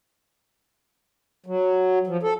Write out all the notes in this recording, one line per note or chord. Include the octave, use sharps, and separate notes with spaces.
F#3
F3
A4